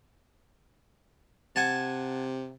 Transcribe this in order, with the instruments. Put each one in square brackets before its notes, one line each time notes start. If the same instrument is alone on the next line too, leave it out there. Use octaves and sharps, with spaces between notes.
[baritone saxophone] C3 [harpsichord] F#5 G#5 A5